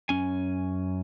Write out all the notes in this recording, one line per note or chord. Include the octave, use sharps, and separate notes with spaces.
F#2 C#4 G#5